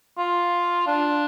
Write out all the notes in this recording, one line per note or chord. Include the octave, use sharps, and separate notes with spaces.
F4
D4